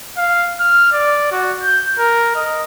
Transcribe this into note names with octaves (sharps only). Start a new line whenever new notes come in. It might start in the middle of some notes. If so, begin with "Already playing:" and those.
F5
F6
D5
F#4
G6
A#4
D#5